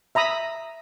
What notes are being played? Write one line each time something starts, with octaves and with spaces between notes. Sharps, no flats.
E5 A#5 B5 D#6